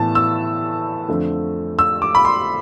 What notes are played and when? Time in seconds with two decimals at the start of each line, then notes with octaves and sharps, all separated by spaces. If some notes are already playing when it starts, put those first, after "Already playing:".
Already playing: A2 E3 B3 A5
0.15 E6
1.09 F2 D3 A3
1.79 E6
2.02 D6
2.15 B5
2.25 C6